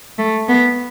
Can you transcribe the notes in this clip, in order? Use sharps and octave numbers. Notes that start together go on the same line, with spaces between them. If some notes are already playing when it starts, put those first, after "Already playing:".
A3
B3